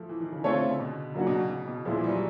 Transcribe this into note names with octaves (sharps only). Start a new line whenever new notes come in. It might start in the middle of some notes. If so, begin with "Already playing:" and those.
Already playing: F3 A3
E3
D#3
C#3
D3 A3 C4 F4 A4 C#5
C#3
B2
C#3 F#3 A#3 D4 F#4
B2
B2
B2
A#2 F3 G#3 B3 E4
E3
G3
F#3